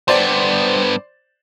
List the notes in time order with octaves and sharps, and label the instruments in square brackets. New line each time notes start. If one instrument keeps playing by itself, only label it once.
[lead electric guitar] G2 B3 [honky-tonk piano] C5 D5 A6